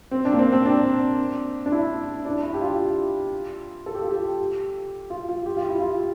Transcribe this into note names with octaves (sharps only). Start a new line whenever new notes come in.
C4
D4
A#3
C4
C4
D4
D4
E4
D4
E4
G4
F4
A4
G4
F4
G4
F4
F4
G4
F4
E4
F4